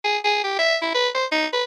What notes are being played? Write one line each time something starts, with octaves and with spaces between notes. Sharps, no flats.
G#4
G#4
G4
E5
E4
B4
C5
D#4
B4